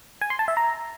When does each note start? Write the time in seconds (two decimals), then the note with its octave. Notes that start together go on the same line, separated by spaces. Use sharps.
0.21 G#5
0.30 C6
0.39 A5
0.48 E5
0.57 A#5